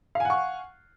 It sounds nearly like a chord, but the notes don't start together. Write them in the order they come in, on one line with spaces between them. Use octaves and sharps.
F5 G#5 F#5 C#6